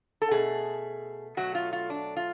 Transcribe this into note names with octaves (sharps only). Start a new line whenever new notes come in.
A4
B2 A3 G#4
B2 F#3 A3 F#4
F4
F4
D4
F4